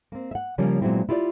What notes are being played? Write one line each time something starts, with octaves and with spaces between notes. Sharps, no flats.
A#3 C4
E5 F#5
C#3 F3 G3 A#3 C#4
A#2 F#3 G#3 B3 C4 E4
E4 F4 G4 C#5 D5